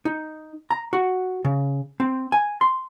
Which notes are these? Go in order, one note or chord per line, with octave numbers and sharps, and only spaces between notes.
D#4
A#5
F#4
C#3
C4
G#5
C6